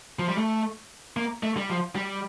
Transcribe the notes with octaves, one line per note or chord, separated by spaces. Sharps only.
F3
G3
A3
A#3
A3
G3
F3
G3